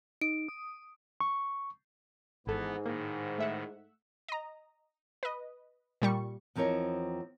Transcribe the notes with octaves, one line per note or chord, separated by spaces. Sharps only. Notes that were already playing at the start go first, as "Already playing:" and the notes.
D#4 D7
D#6
C#6
G#1 G#2 E3 B3 E4 A4
A2 D#3 A#3
A3 E5 F#5
D#5 A#5
B4 D#5
A#2 G3 C#6
E2 F3 C4 A#4 C#5 D#5